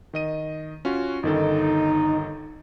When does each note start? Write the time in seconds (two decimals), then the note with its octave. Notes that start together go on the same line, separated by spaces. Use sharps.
0.13 D#3 D#5 D#7
0.85 C#4 F4 F#4
1.23 G1 D#3 D#4 A4